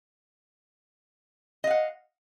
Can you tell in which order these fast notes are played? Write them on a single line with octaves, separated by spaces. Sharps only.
D#5 F5 F#5